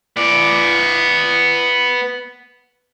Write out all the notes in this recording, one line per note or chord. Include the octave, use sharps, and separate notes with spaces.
B3 D5